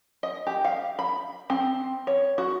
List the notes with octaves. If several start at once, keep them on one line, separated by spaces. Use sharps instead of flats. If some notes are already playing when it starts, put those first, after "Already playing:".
D#5
G4
F5
B5
C4
C#5
F#4